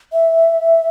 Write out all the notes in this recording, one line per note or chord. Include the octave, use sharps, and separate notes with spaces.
E5